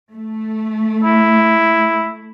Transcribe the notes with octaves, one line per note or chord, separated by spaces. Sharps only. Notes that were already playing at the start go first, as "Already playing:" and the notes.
A3
E4